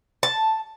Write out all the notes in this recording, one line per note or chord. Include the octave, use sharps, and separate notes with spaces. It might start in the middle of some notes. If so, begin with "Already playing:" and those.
A5